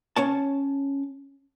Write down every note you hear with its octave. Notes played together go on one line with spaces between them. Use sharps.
C#4 C#5 A5